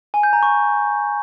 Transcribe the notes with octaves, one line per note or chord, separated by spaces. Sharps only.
G#5
G6
A#5
C#6